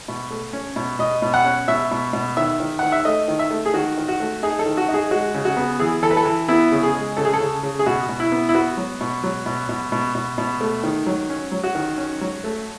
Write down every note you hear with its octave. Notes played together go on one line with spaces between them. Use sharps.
B2
A3
C#4
B2
B2 D#5
B2
F#5
C#4
B2 E5
B2
B2
D#3 E5
D#3
D#3 F#5
E5
A3 D#5
D#3
E5
A3
G#4
D#3 F#4
D#3
F#4
A3
D#4 G#4
A4
D#3
F#4
D#4
G#4
G#3 F#4
C#3
F#4
B3
E3 G#4
E3 A4
B4
A4
E3
B3 E4
C#3
G#4
G#3
C#3 A4
G#4
A4
C#3
C#3
G#4
B2 F#4
B2
E4
B3
E4
B3 F#4
F#3
B2
F#3
B2
B2
B2
B2
B2
A3
D#3
F#3
C#4
F#3
F#4
D#3
C#4
F#3
A3